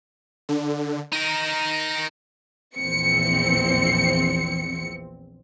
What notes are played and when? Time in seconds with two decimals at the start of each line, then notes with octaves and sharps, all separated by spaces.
0.49 D3
1.13 D#4 A#4 A#6
2.77 A#1 E2 C4 C#7